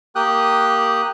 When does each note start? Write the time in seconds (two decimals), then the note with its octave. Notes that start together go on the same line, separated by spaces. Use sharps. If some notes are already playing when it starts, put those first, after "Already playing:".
0.15 A#3 G4 G5 D#6 F#6